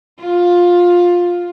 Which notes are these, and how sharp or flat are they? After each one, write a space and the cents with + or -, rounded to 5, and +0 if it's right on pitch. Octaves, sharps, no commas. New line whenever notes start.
F4 +10